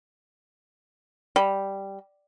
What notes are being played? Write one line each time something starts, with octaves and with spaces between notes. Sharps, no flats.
G3